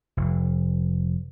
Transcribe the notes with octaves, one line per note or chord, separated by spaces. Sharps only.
F1